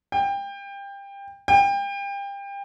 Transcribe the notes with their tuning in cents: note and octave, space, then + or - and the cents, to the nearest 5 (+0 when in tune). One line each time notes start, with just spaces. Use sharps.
G5 +25
G5 +30